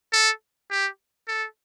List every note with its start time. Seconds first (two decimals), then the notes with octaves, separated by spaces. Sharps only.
0.13 A4
0.71 G4
1.28 A4